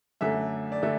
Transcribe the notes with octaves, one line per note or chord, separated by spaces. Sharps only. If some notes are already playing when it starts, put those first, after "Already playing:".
F#2 D3 A3 E5
D5
D3 A3 E5